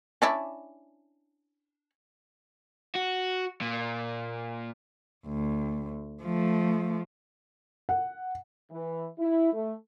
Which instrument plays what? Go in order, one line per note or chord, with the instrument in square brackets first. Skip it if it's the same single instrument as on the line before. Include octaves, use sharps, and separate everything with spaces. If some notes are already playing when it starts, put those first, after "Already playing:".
[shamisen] C#4 D4 E4
[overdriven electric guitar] F#4
A#2
[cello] D2
F3 A3
[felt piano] F#5
[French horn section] E3
E4
A3